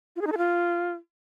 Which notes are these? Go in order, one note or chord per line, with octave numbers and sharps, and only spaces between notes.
F4
G#4
D#4
A4
F4